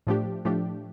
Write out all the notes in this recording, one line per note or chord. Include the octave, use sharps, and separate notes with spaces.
A2 F3 A3 D4 G4
A2 F3 A3 D4 G4